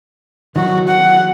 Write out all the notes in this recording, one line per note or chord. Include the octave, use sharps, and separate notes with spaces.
D#3 F#3 F#4
F#5